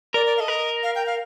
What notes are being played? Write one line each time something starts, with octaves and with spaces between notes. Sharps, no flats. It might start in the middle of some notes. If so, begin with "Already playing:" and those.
A#4 D5
D5
F5
A4 D#5
A#4
F5
G5
F5